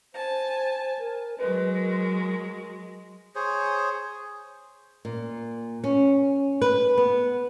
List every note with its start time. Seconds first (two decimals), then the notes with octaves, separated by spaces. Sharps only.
0.14 C5 G#5 A5
0.99 A#4
1.38 F#3 G#3 B4
1.79 A#4
3.35 G#4 C5 C#5
5.05 A#2
5.84 C#4
6.61 B4
6.98 B3